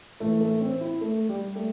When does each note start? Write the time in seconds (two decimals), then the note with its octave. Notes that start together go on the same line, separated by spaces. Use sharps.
0.20 A2 E3 A3
0.41 A3
0.61 C4
0.81 E4
1.01 A3
1.29 G3
1.56 A3